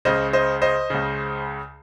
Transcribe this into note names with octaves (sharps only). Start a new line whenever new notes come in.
C#2 C#3 C5 D#5
C5 D#5
C5 D#5
C#2 C#3